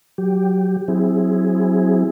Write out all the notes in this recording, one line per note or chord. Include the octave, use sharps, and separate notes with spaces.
F#3 G4
F#3 C4 E4 G#4